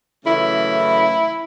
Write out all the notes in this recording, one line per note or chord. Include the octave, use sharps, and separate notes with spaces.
F#2 C#3 E3 A3 E4